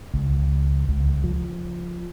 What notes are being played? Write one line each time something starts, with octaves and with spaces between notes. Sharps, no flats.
C#2
C#2
F3